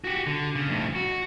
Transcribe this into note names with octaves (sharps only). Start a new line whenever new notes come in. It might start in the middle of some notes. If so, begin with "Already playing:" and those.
F#4 G4
D3
C#3
F2 A2
F#4